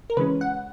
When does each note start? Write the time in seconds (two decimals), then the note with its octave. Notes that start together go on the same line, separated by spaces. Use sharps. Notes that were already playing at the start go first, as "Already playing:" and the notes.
0.10 A#4
0.17 C#3 E3 G#3 C#4 B4
0.41 F#5